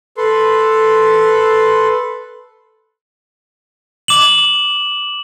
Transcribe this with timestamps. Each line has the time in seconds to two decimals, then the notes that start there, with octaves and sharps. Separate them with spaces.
0.17 A4 B4 C6
4.08 D6 E7 F#7